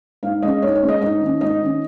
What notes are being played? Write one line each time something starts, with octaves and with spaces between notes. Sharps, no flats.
G#2 F5
G#3 C#4 D#5
G#2 C#5
C#5
G#3 C#4
D#5
G#2 D#5
D#3
C#4
G#2 D#5
D#3 C#4